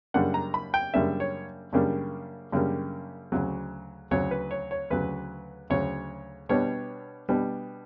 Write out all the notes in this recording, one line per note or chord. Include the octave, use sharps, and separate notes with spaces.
F#2 C#3 G3 A#3 D4 F#5
A#5
B5
G5
F#2 C#3 G3 A#3 D4 E5
C#5
F#2 C#3 G3 A#3 D4
F#2 C#3 G3 A#3 D4
D2 C#3 F#3
D2 C#3 F#3 C#5
B4
C#5
C#5
D2 C#3 F#3 B4
D2 C#3 F#3 C#5
B2 G3 B3 D4 C#5
B2 G3 B3 D4